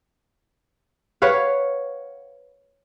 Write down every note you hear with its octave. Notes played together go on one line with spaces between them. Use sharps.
B4 C#5 F5 F#5